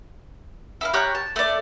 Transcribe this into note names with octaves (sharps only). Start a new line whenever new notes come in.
E4 A4 F5
G4 C#5 A#5 F#6
A5
A3 D5